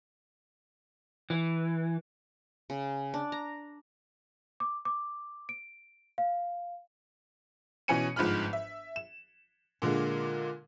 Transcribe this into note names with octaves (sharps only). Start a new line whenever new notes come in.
E3
C#3
D4
A#5
D6
D6
D7
F5
B2 E3 C#4 G#5 C#7 D#7
G1 G#2 F3 B5 F6
E5
E7
A#2 D3 G#3 A#3